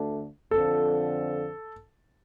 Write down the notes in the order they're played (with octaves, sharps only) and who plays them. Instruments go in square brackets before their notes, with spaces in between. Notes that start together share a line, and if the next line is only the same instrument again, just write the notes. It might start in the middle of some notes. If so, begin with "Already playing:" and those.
Already playing: [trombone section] D2 D3 A3 D4
[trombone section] F2 D3 F3 C4 [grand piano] A4